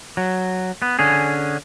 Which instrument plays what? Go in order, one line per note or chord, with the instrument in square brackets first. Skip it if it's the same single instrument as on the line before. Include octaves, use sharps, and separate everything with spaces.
[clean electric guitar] F#3
B3
D3 C#4 G#4